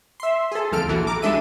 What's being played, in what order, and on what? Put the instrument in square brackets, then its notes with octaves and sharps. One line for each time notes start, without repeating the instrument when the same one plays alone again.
[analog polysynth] E5 C6
G#4 A4
D2 C3 F3 A4 F6 D7
A#1 E3 F#4
A#5 D6
G3 G#3 D4 A4 E5 D#7